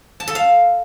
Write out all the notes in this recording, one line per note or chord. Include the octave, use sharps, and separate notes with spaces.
A5
A4
F5